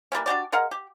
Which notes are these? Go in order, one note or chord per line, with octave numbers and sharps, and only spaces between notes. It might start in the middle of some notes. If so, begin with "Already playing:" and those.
E3 G3 A#3 C#4
D4 F#4 G4 D5
G#3 A#4 F5 F#5
G4